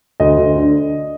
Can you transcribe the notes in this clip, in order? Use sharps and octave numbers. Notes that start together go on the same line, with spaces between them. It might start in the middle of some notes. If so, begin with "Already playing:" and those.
D2 D#5
D2
D3